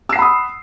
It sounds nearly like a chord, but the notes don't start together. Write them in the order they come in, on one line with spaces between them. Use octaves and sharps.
E6 C7 F#5 B5 D#6